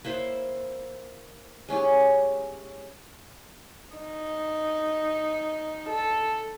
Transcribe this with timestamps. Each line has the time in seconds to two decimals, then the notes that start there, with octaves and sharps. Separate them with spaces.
0.05 A#3 E4 C5 E5
1.68 G#3 C#4 E4 G4
3.96 D#4
5.90 A4